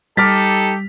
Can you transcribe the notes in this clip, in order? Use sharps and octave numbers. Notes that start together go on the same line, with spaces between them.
G3 D#4 G4 A4 D6 F6 A6 B6